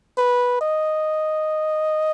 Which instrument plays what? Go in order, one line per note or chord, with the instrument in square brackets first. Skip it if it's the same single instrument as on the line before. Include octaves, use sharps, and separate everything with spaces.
[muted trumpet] B4
D#5